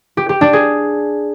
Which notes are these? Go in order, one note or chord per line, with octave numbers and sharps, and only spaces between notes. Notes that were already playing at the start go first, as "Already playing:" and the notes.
G4
G4
D4
G#4